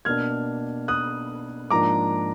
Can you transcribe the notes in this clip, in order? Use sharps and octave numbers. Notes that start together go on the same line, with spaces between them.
B2 A#3 D4 F6 G#6
D#6 F#6
G#2 F3 A#3 D4 A#5 D6